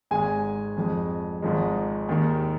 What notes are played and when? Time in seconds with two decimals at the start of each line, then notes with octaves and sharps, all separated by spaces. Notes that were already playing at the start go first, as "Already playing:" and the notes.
0.11 G#1 G#2 G#3 G#5
0.77 F2 F3 G#3
1.42 G#1 G#2 F3 G#3
2.09 D#2 D#3 G#3